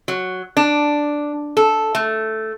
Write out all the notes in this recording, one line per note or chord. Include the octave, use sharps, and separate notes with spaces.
F#3
D4
A4
A3